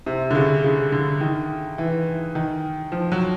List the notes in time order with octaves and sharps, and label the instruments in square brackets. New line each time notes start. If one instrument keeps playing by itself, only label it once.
[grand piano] C3
D3
C#3
C#3
D3
D#3
E3
D#3
F3
F#3